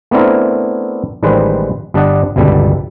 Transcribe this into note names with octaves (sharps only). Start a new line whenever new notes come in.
A3 B3 C4 D4 E4 A#4
A1 D#3 G3 G#3 B4 C5
G1 G3 D4 D5 D#5 F#5
G1 C#2 B2 G3 A4